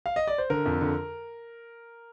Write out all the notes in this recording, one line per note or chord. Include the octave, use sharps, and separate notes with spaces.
F5
D#5
D5
C5
D3 A#4
F2
D3